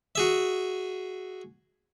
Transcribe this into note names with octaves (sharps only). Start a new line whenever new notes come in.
F#4 G#4 E5